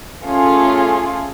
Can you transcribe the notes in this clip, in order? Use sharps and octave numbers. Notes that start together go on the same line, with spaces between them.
A3 C#4 F4 G#4